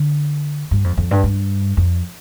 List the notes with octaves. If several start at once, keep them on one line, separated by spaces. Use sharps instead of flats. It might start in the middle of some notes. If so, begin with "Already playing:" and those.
Already playing: D3
G2
F2
F2
G2
G2
F2